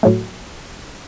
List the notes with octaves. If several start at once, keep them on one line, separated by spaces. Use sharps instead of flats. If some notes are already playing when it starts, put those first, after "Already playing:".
A2 F#3 A3